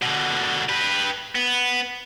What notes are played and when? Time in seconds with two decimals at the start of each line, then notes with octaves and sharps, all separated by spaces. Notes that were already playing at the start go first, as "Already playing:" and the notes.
0.02 B2 D3
0.69 G4 B4
1.35 B3